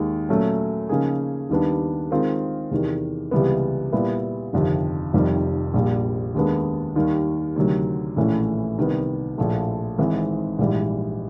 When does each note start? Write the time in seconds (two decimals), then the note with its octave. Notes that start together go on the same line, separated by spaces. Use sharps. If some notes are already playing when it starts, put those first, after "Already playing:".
Already playing: D#2 D#3 G#3
0.29 A#2 F#3 A3 C#4
0.89 C#3 F3 A#3 D#4 G#4
1.49 D#2 D#3 G3 B3 D4
2.11 D#3 G#3 C4 F4 A#4
2.71 E2 C3 D#3
3.31 C#2 C3 E3 G3 B3
3.92 A#2 G3 B3 E4
4.53 G1 F2 C3 D#3
5.13 F1 F2 C3 D#3 G3
5.74 A#1 A#2 G3
6.34 D#2 D#3 G#3 B3 D4
6.96 D#2 D#3 G3
7.56 D2 C3 D#3 F#3
8.16 A#1 A2 E3 A3 C#4
8.78 C2 C3 D#3 G3 B3
9.38 A#1 A2 F3 A3
9.98 G#1 G#2 E3 G#3 C4
10.59 A#1 G#2 E3 G3